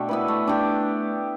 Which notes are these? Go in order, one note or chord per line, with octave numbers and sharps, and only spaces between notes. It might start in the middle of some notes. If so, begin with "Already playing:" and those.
Already playing: B2 A3 D4 G4 A4
B3 E4 B4
A3
D4 G4